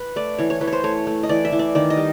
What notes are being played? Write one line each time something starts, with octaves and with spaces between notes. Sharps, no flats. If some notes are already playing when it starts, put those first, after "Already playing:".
Already playing: B4
A3 D5
E3 C#5
C#5
E3 B4
C#5
C5
A3 C#5
A3
D#5
E3 D5
E5
E3
D5
D#3 D5
D#5
G3